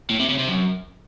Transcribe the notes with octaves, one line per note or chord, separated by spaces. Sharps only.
A2
C3
C#3
C3
F#2